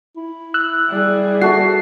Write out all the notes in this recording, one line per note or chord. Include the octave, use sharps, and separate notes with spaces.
E4
E6 F#6
G3 G#4
F#4 A4 E5 C7